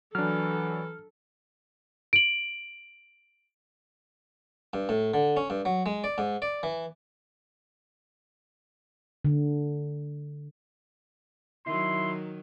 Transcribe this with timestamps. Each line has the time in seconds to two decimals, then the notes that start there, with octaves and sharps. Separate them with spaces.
0.15 E3 F#3 D4 A4 F6
2.13 D7 F#7
4.73 G2
4.89 A2
5.14 D3
5.37 C#4
5.50 G2
5.65 F#3
5.86 G#3
6.04 D5
6.18 G#2
6.42 D5
6.63 E3
9.25 D3
11.66 D#3 F#3 E4 C6